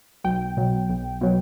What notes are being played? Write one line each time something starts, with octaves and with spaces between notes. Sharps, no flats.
B1 G5
B2 F#3
B1
B2 F#3